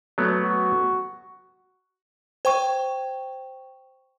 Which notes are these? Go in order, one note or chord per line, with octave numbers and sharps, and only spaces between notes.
F#3 A3 B3
F#4
C5 G5 C#6